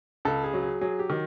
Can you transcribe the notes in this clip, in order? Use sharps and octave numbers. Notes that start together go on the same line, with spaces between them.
C#2 A4
G#4
F#3
G#4
F#3 G#4
G4
D#3